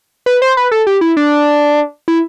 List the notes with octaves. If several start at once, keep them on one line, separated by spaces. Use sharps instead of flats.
B4
C5
B4
A4
G4
E4
D4
E4